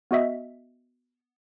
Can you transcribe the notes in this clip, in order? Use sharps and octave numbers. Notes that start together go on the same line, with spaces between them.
B3 F#4 D#5 E5